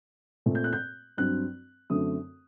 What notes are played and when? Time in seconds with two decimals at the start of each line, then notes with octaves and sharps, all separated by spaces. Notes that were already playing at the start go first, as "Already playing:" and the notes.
0.46 A#2 A3 C4
0.55 G6
0.64 F#6
0.73 G6
1.17 G2 F#3 C4 F#6
1.90 F#2 D3 F#3 A3 C4 D#6